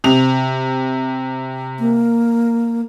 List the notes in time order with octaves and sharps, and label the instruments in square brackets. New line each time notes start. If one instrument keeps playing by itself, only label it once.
[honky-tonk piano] C3 F7
[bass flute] A#3